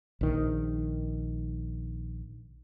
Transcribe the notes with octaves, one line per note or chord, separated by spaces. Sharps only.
A#1 D#3